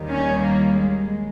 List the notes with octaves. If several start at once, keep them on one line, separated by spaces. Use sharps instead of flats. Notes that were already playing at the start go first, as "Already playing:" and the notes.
Already playing: D#2 D#3 G3
C#4
A#3
G#3